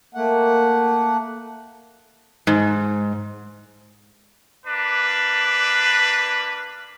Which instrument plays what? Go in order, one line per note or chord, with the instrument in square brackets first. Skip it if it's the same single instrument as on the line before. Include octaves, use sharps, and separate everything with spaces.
[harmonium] A3 A#3 F#5
[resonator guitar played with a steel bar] G#2
[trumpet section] A#3 D4 B4